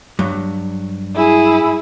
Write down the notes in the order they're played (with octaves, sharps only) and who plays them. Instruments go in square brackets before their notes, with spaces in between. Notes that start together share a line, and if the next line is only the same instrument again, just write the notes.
[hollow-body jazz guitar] G2 F#3
[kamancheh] E4 G#4